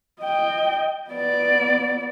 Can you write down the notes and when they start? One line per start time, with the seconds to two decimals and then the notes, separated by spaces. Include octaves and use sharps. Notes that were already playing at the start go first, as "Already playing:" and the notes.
0.21 D#5 G5
1.10 B3 D5